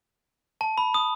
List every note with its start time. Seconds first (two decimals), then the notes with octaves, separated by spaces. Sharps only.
0.61 A5
0.78 B5
0.94 D#6